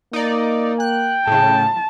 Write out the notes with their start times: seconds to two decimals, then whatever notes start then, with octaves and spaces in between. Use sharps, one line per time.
0.13 A#3 D#4 D5
0.80 G5 F#6
1.27 A2 C#3 A5